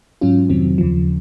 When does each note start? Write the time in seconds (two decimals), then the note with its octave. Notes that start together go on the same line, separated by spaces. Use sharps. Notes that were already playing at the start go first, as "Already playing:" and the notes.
0.21 G#2 F#3 C#4 F4
0.49 F2 C3 D#3 F#3 C4
0.78 D#2 C#3 F3